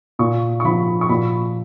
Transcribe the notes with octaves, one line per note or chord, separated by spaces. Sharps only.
A#2 C#6
C#6
F3 B5
C#6
A#2 B5